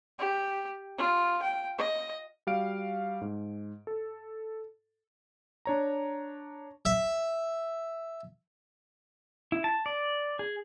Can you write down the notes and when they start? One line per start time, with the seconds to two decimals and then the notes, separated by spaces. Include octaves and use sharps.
0.19 G4
0.98 F4
1.42 G5
1.78 D#5
2.47 G3 F#4 F5 D7
3.21 G#2
3.87 A4
5.65 D4 C#5 A#5
6.85 E5
9.52 E4
9.64 A5
9.86 D5
10.39 G#4